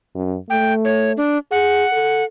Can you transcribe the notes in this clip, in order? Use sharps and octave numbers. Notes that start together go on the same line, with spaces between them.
F#2
A3 G5
C#5
D4
G#4 F#5
A4